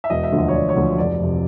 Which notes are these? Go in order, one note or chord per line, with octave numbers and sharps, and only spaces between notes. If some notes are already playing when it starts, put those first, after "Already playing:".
E5
E1 D#5
E5
D2 D3 F3
D#5
C#5
E1 D5
C#5
D2 D3 F3
F1 D5
F2 C3